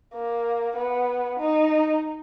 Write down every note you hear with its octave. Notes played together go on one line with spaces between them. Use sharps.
A#3
B3
D#4